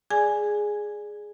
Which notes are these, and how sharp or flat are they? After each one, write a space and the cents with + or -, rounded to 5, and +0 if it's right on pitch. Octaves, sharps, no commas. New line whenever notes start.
G#4 +0 D5 +0 G#5 +0